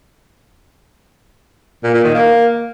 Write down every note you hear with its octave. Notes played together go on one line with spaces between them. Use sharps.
A#2
A#2
D#3
A#3